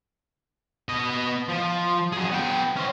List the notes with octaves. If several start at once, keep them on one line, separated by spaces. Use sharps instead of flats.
B3 D#5
F3
F#3 G#4
B3 G5
C#4 C5